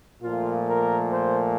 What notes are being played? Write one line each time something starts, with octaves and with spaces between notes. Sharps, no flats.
A#2 F3 A3 F4
A#4
C5